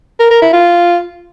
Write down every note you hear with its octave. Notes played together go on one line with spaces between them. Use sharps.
A#4
A#4
E4
F4